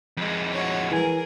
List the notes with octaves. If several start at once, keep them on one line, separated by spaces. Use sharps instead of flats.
F2 G#3
F#4 C#5
E3 G#4 A#4 G#5